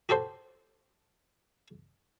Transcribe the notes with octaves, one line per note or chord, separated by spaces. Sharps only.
F#4 G4 A4 C5